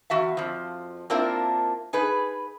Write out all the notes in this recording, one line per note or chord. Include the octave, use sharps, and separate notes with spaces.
E2 F#4 E5 F5
F2 F3
A#3 C4 D4 E4 F4 A#4
D#4 G#4 B4